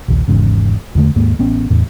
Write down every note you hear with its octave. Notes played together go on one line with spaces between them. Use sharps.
A#1 D#2
G#1 E2 G#2 C#3
E2 D3 A3
D#2 G#2 A#3
A1 B3 C#4
E2 A2